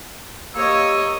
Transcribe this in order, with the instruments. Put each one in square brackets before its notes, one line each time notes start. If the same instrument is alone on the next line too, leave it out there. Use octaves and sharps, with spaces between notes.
[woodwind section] A#3 G4 E6 [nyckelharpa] C#5 D#5